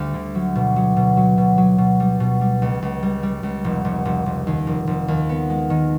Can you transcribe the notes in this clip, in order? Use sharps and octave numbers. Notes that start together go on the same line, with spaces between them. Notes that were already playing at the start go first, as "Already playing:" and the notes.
Already playing: D2 G3
D3
F#3
B2
F#3
B2
F#3
B2
F#3
B2
G3
B2
G3
C#2
C#2
G3
G3
C#2
F1
F1
F1
F1
D#2
F1
F1
D#2
B3
G#3
D#3